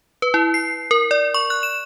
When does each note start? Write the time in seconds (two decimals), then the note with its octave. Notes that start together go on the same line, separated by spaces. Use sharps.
0.22 B4
0.34 E4
0.54 C7
0.91 A#4
1.11 D5
1.34 C#6
1.50 F#6
1.63 E7